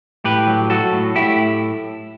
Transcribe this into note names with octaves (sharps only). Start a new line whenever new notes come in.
A2 G4 B4
F#3
F#3 F#4 A4
A2
A2 E4 G4